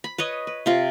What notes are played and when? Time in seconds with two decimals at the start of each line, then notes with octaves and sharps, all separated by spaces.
0.04 B5
0.18 B4 C#5 D#5
0.47 B4
0.66 C3 F4